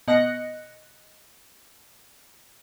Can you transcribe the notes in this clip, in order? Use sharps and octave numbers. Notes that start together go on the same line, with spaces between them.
B2 D#5 F#6 A#6 C#7